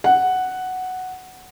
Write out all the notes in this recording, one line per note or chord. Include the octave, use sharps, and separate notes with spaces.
F#5